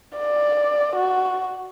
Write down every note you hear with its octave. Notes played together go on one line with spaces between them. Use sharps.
D5
F#4